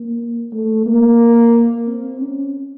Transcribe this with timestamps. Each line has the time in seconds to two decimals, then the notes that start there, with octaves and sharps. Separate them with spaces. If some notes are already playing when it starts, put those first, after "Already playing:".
Already playing: A#3
0.52 A3
0.87 A#3
1.87 C4
2.21 C#4